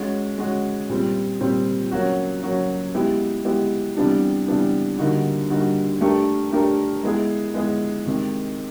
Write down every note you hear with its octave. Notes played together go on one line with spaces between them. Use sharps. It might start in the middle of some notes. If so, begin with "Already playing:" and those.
Already playing: G#3 C#4 F#4
G#3 C#4 F#4
A#2 G3 C4
A#2 G3 C4
F#3 A#3 C#4 F#4
F#3 A#3 C#4 F#4
G#3 B3 E4 G4
G#3 B3 E4 G4
C3 E3 G3 B3 D4
C3 E3 G3 B3 D4
D3 G3 A#3 D#4 F#4
D3 G3 A#3 D#4 F#4
A3 D4 G4 A#4
A3 D4 G4 A#4
G#3 B3 E4 G#4
G#3 B3 E4 G#4
C3 D#3 G#3